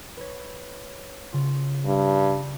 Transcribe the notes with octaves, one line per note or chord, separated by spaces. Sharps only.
B4 C#5
C#3 F4
G2